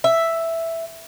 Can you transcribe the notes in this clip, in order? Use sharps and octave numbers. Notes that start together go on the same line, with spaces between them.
E5